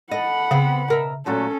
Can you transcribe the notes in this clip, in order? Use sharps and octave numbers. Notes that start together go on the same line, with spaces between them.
A4 D#5 F#5 B5
C#3 B3 C4
B2 A#4 E5
A#2 F#3 A3 C#4 A4